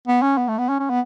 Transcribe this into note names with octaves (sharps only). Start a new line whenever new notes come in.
B3
C#4
B3
A3
B3
C#4
C#4
B3